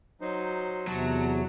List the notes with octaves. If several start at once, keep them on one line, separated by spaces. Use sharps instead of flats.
F#3 D#4 C5
E2 C3 F#3 A5 A#5